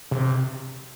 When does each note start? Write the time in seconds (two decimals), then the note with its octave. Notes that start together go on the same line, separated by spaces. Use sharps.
0.11 C3